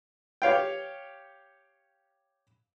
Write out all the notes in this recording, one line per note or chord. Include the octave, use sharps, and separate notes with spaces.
G4 C#5 F5 G5